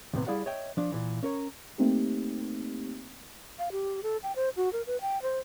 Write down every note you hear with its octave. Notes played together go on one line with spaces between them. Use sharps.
D#2 A2 C3 B3
G3 E4 G#4 D5 F5 F#5
C#5 D#5 E5 G5
F3 D4
A#2 E3
C#4 A#4 C#5
A3 A#3 C4 D#4 G4
F5
G4
A4
G5
C5
F#4
A#4
B4
G5
C5